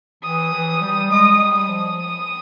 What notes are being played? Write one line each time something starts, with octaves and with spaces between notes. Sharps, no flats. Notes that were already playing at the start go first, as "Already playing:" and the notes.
E3 D#6
E3
G3
G#3 D#6
G3
D#6
F3